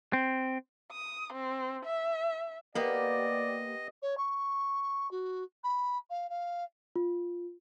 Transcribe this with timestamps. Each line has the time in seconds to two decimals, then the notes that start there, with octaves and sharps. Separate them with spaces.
0.13 C4
0.92 D#6
1.33 C4
1.85 E5
2.75 A#3 B3 G4 D5 D#5
4.02 C#5
4.17 C#6
5.11 F#4
5.63 B5
6.10 F5
6.29 F5
6.96 F4